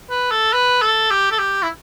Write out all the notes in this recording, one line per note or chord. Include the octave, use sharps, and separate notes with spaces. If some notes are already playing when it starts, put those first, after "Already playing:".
B4
A4
B4
A4
G4
A4
G4
E4